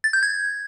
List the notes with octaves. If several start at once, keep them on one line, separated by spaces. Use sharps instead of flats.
A6
G6
G#6